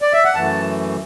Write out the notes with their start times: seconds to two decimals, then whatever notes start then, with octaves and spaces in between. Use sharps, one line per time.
0.02 D5
0.13 E5
0.24 F#5
0.35 F#2 E3 A3 A5